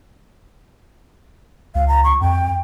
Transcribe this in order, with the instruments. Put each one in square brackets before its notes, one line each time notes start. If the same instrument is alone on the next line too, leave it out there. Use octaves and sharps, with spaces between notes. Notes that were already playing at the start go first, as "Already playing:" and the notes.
[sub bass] C#2 [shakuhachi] F5
[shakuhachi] A#5
C#6
[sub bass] F2 [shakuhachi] G5